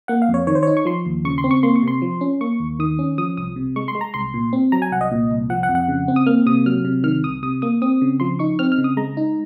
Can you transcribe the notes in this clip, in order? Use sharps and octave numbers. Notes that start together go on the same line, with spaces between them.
A#3 F#5
F5
F2
C#5
D#3 C#5
C5
D#4 C#5
C#6
F3 C6
D#2
C#3 C#6
C6
C4
C#6
A#3 C6
C#6
C3 C6
F3
C#4
A#3 C#6
D#2
D#3 D#6
C#4
F3 D#6
C2 D#6
C3
G#3 C#6
C6
G#3
A#5
C2 C6
A#2
C4
F#3 A#5
G#5
C2 F#5
D#5
A#2
C2
F3 F#5
F#5
F2
F#5
C#3
C4
D#6
A#3 F6
C3 D#6
F#3 F6
C3
D#3 F6
C2 D#6
C3 D#6
A#3 D#6
C4 D#6
C#3
F3 C6
D#4 C#6
C4 F6
F6
C#3
D#6
G#3 A#5
D#4